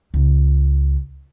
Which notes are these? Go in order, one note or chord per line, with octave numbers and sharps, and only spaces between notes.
C#2